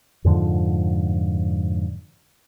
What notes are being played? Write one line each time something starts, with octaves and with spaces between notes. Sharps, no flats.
F2 G#2 D3 F3